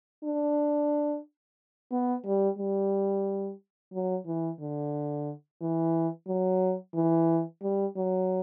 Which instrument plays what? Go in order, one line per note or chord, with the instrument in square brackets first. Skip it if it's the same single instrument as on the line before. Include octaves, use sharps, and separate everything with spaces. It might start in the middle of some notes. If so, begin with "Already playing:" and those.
[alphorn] D4
B3
G3
G3
F#3
E3
D3
E3
F#3
E3
G3
F#3